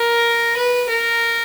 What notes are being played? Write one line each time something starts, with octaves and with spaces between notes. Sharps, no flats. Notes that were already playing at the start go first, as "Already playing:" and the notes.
Already playing: A#4
B4
A#4